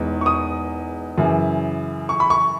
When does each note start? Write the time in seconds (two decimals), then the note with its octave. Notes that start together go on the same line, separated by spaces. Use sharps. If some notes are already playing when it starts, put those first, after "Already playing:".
Already playing: E1 E2 D#3 G#3
0.21 C#6
0.26 D#6
1.18 F#2 C#3 E3
2.09 C#6
2.20 B5
2.30 C#6